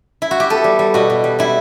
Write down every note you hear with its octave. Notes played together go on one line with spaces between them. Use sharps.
E4
F#4
G4
B3 A4
G3
G3
B2 F#4
B2
G3
G3 E4